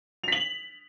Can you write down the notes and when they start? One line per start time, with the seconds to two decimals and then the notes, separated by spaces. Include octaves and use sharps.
0.24 F7
0.28 B6
0.32 F#7